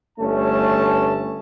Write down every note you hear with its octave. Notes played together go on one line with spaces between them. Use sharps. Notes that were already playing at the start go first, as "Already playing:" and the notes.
G1 A3 C#4 A5